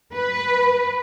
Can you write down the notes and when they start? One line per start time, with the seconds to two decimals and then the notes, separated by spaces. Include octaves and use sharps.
0.14 B4